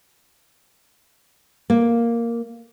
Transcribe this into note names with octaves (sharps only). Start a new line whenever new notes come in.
A#3